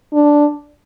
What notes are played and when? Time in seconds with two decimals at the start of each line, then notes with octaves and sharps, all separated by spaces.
0.14 D4